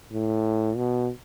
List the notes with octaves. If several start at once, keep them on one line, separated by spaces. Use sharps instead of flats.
A2
B2